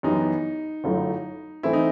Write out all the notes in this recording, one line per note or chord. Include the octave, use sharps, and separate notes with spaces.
F#2 E3 G3 B3 D#4
G1 F#2 F#3 A3 E4
E3 A3 C4 E4
D#4